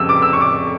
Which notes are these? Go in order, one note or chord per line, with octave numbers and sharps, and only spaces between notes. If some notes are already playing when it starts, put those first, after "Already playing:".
Already playing: F1 F2 C#3 G3 E6
D6
E6
C#6
D6